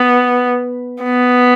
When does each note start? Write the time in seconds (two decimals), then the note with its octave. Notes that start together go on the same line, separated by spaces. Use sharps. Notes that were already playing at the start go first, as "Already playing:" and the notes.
Already playing: B3
1.03 B3